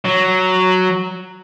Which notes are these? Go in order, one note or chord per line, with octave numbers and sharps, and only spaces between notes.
F#3